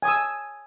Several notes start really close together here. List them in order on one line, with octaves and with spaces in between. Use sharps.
G#5 D#6 E6